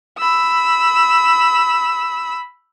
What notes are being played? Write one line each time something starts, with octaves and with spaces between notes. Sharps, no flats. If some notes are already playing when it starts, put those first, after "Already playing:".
B5 E6